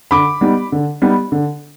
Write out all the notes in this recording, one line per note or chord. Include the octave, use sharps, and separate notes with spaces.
D3 B5 D6
G3 B3 D#4
D3
G3 B3 D#4
D3